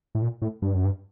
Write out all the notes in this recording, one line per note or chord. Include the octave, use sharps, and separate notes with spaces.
A2
A#2
A2
G2
F#2
G2